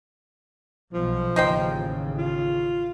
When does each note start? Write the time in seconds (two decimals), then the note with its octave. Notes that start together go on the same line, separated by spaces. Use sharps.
0.93 B1 B2 F3
1.36 A1 D#2 C#3 D#4 C5 G5
2.17 F4